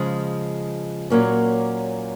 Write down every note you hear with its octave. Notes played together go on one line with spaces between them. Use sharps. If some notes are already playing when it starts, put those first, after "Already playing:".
Already playing: C#3 F3 G#3
A#2 F#3 A#3 C#4